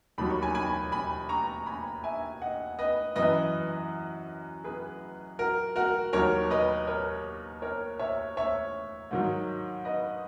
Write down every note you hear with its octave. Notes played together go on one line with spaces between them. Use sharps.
D#2 D#3 F#3 B5
C#6
G#5 B5
G#5 B5
G#5 B5
A#5 C#6
G#5 B5
E5 G#5
D#5 F#5
B4 D#5
F#2 E3 B4 D#5
G#4 B4
F#4 A#4
F#4 A#4
D#2 D#3 F#3 A#4 C#5
B4 D#5
A#4 C#5
A#4 C#5
C#5 E5
C#5 E5
G#2 D#3 F#3
B4 D#5